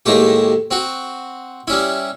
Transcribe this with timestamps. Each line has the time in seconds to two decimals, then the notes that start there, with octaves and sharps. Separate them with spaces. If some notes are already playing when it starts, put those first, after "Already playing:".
0.06 D#2 A2 G#3 A3 G4
0.71 C4 F#4
1.67 G3 C#4 E4